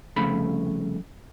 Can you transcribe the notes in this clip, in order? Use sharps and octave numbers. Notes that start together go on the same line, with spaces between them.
C2 F2 C#3 A3 B5